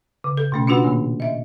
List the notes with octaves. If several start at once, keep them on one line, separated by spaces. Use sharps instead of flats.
C#3
A4
B2 A3 C#4
C#4 D4 F4 F#4 B4 F#5
A#2 D#3 A#3
D#5 E5